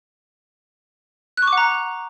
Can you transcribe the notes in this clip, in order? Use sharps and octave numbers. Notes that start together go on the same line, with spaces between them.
F#6
C#6
D6
F#5
A#5